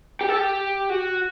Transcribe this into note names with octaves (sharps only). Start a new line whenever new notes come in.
G4
A4
G4
F#4